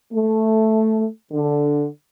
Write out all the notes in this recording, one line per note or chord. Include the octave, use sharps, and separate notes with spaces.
A3
D3